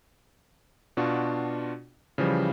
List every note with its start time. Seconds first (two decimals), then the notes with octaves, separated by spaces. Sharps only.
0.97 B2 D4 F4 F#4
2.18 C#3 E3 F3 G3